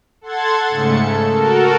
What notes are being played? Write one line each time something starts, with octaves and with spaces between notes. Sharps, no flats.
A4 F#5 C6 G#6 A6
G#2 C#3 A3 C#7
A4
F#4 A4 A#4